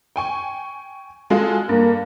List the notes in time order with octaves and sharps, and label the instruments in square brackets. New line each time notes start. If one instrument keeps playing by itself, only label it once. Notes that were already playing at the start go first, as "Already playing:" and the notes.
[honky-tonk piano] G5 G#5 C#6
[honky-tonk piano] G#3 F4 F#4 [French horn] A4
[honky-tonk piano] G2 [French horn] A#3